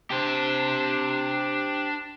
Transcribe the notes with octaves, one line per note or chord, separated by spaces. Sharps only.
D4 G4 C5